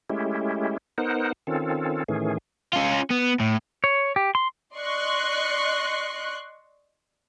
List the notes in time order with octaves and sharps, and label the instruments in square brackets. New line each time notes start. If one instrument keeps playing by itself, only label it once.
[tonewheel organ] G#3 A3 C#4 E4 G4
B3 D#4 A#4 C5 F#5
D#3 C4 C#4 F4 A4
A2 D#3 E3 A3 C#4 G#4
[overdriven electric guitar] C#4 F4
B3
A2
[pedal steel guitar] C#5
G4
C6
[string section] D5 D#5 C6 C#6 F#6